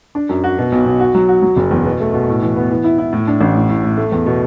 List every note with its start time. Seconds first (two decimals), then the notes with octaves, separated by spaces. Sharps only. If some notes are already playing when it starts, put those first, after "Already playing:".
0.15 D4
0.29 F#2
0.44 F#4
0.58 B2
0.72 B1
0.85 B1
1.00 F#4
1.15 F#3
1.29 F#4
1.42 F#3
1.57 F#1
1.71 E2
1.85 B2
2.00 A3
2.14 B2
2.28 A2
2.42 E3
2.56 B3
2.71 E3
2.84 E4
2.98 E4
3.13 A2
3.27 D4
3.41 A1
3.55 A2
3.69 A2
3.83 A2
3.97 A3
4.12 E2
4.26 B2